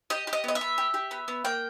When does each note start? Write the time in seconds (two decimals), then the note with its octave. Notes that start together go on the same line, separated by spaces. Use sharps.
0.10 G4 D#5
0.27 G4
0.33 D#5
0.44 B3 D#5
0.55 E5
0.61 B3
0.78 G4
0.94 G4
1.11 B3
1.28 B3
1.45 A#3 G5